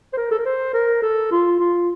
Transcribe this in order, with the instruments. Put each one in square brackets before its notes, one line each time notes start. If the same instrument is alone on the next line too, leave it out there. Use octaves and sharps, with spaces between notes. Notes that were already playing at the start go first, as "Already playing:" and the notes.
[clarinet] C5
A#4
A4
A#4
C5
A#4
A4
F4
F4